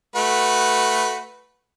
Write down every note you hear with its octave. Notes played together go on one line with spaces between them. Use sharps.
A3 F#4 B4